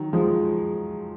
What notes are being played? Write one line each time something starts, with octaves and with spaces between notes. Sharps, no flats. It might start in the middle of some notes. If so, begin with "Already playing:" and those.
Already playing: D#3 F#3
F3 G#3